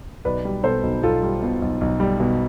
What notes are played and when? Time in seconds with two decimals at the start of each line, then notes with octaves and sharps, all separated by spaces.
0.25 B1 B4 D5
0.45 G3
0.63 B2 A4 C5
0.83 B1
1.03 B1 F4 A4
1.23 G3
1.42 B2
1.62 B1
1.81 B1
2.00 G3
2.20 B2